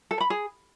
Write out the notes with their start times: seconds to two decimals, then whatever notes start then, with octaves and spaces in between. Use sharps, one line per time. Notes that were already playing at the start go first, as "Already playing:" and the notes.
0.11 A4
0.20 B5
0.30 G#4